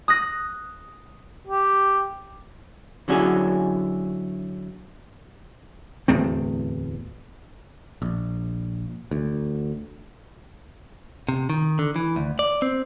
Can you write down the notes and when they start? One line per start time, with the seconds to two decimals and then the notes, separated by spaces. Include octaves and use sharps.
0.08 D#6 F#6 A#6
1.48 G4
3.08 D3 F#3 C#4 E4 G#4
6.08 D1 E2 A3 C4
8.02 A#1
9.11 D2
11.29 C3
11.50 D#3
11.79 D3
11.96 E3
12.16 D2
12.39 D5
12.62 C4